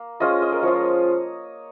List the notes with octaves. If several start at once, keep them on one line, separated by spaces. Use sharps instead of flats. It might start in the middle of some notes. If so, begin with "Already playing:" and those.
Already playing: A#3
G#3 C#4 F4 D#5
D#5
A#4
F3 G#3 F4 C#5